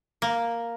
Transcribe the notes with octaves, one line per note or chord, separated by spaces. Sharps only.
A#3